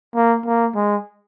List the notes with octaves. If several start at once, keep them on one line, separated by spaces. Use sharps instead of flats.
A#3
A#3
G#3